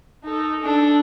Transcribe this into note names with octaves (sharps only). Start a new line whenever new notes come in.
D#4 A4
D4 A4